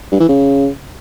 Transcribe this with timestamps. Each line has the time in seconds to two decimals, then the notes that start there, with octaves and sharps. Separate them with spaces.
0.12 G2
0.20 E3
0.29 C#3